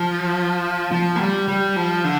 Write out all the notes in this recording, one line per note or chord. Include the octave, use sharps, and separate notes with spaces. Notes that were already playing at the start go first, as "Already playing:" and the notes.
Already playing: F3
F3
A#3
G3
G3
F3
D3